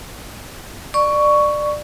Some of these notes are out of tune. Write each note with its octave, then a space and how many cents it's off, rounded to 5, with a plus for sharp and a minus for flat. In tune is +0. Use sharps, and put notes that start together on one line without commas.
D5 +20 C#6 +10